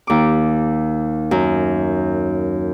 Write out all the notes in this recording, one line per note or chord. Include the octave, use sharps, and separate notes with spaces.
D#2 D6
F#2